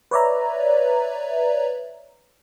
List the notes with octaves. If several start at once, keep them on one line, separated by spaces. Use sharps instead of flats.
B4 C#5 D5 E5 A#5